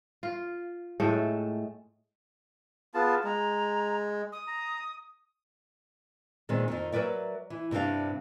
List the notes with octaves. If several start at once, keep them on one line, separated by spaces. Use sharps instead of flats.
F4
A2 G#3 A3 A4
B3 F4 G#4 A5
G#3 A#5
D#6
A#5
A#2 D#3 G#3 B3 C4
F2 D#3
F#3 A#4 B4 D5 E5
E3
G2 C3 F#3 D4 F5